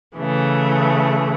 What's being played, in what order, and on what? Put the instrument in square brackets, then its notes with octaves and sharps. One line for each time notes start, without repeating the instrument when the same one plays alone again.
[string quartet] C#3 E3 A3